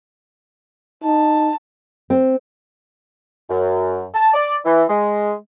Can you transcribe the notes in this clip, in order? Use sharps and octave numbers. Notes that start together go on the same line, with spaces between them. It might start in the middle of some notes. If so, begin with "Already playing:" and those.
D#4 A5
C4
F#2
A5
D5
E3
G#3